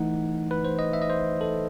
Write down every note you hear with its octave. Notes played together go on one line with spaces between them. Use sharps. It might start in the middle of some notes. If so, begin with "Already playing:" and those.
Already playing: E3 A3 D#4 F#5
B4
C5
D#5
E5
D#5
C5
A4